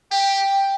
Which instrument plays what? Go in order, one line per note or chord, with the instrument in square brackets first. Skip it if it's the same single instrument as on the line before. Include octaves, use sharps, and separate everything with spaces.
[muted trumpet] G4 [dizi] G5